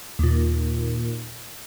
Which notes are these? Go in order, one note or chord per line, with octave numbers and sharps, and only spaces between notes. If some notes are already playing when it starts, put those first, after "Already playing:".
D#2 A#2